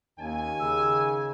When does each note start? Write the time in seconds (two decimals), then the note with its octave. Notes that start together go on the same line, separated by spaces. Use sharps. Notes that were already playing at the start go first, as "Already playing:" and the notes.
0.19 D#2 D#3 C#4 G#5
0.60 C#3 E6